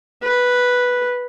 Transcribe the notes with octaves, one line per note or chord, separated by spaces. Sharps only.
B4